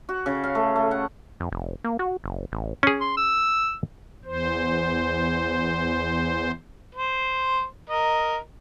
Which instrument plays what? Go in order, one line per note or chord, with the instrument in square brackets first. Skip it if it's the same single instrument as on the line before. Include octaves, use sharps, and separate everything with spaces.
[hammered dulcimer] F#4
C#3
F5
A3
A3
F#5
[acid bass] F2
F1
A#3
F#4
F#1
A1
[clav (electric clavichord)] C#4 G#4
[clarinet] C6
E6
[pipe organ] E2 C5
[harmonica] C5
A#4 D#5